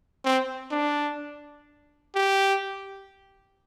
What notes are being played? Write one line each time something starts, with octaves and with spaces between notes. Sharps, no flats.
C4
D4
G4